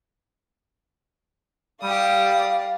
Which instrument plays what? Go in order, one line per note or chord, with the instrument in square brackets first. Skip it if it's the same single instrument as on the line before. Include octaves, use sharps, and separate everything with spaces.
[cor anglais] G3 [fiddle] G4 D#6 [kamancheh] D5 F5